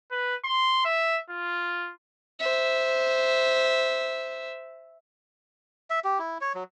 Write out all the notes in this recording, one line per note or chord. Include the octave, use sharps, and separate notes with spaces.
B4
C6
E5
F4
C5 E5
E5
G4
E4
C#5
F#3